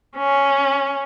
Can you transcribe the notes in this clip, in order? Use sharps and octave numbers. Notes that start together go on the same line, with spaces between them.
C#4